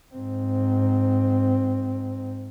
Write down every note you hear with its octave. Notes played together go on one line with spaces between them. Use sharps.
G#2 C4